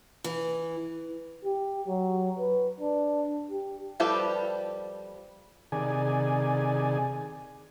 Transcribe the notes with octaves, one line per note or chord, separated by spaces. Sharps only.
E3
G4
F#3
B4
D4
G4
F3 G3 G4 A4 B4
C3 D#3 G#4 D5 G#5